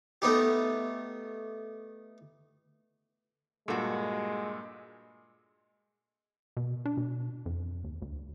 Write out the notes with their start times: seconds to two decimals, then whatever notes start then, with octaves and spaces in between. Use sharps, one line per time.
0.22 A3 B3 D#4 G4
3.68 G2 A#2 G#3 F#4 A4
6.57 B2
6.86 D4
6.97 B2
7.46 F2
7.84 D#2
8.02 D2